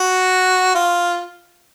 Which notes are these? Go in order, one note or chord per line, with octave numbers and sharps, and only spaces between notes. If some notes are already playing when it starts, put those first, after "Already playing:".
Already playing: F#4
F4